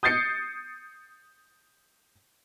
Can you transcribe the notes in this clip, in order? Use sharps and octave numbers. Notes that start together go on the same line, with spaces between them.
D#6 G6 A6 C7 C#7